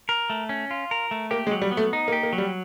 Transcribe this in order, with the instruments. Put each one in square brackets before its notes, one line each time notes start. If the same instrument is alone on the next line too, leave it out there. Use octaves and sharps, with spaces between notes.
[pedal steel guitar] A#4
A3
C#4
F4
A#4
A3
[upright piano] A#3 [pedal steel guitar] G4
[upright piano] G#3
[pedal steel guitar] F#3
[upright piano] G3
[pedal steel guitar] B3
[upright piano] A3
[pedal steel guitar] D#4
[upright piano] A#3
[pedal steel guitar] G4
[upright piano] A#3
[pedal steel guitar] F#3
[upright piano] G3